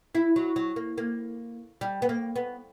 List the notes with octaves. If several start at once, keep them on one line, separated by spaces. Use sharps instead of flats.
E4
F#3
F#3
A#3
A#3
G3
B3
A#3
B3